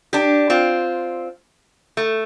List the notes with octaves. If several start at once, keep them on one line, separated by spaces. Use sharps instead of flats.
D4 G4
C4 F4
A3